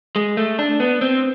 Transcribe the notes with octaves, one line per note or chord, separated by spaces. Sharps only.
G#3
A3
D4
B3
C4